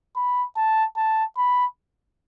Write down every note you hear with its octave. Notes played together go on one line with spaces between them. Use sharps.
B5
A5
A5
B5